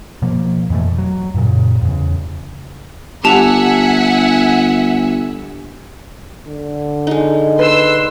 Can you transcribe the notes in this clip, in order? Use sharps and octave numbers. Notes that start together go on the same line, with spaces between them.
B2 F3 A#3
F2 B2 E3 A3
F#3
F#2 A#2 C#3
E2 C#3
G1 G4 E5 F#5 G#5 A5 F7
D3
G#3 D#4
B4 C6 E6